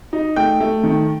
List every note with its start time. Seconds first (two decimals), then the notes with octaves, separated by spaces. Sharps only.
0.13 D#4
0.36 A3 G5
0.60 A3
0.83 D#3